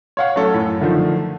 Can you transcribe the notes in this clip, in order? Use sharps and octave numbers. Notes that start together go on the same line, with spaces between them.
C#5 F5 F#5
F#3 A3 C#4 A4 C#5
F#2 A2
D3 D#3 F3 A3